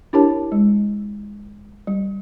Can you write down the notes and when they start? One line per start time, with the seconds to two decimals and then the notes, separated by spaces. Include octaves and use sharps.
0.13 D4 E4 G4 A#4 C#5 A5
0.52 G#3
1.87 G3